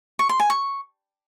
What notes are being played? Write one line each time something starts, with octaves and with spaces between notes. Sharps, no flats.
C#6
C6
G#5
C#6